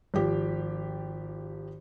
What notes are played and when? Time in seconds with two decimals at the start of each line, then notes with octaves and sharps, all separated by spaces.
0.14 G#1 F3 G4